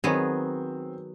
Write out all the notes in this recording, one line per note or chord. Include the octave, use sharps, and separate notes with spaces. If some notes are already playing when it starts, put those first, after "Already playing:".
D#3 F#3 B3 C4 G#4